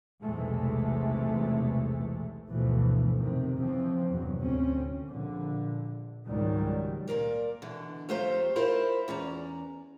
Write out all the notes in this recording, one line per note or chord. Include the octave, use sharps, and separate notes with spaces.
B1 E2 C3 E3 G#3 A3
D2 G2 B2 E3 F3 A3
F2 C3 D#3
C#3 E3 F3 C4
E2 G2 C3 F#3
D2 A2 C4 C#4
A#1 D3
C#2 G#2 D#3 F#3 G3
A#2 C#3 A#4 D5
B2 D3 E3
F2 A3 F4 G4 C5 A#5
E4 F4 A#4 C5
E2 C#4 D5 A#5